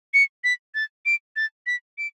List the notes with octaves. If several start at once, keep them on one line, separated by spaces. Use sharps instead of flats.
C#7
B6
A6
D7
A6
B6
D7